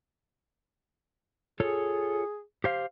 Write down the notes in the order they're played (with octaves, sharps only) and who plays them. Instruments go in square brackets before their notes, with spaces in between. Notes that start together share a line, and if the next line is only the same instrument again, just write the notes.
[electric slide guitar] F4 A4 C#5 [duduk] G#4
[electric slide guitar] G4 C5 F5